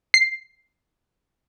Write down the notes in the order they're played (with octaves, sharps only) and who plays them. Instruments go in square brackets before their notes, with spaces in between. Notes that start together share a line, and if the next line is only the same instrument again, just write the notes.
[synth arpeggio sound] C7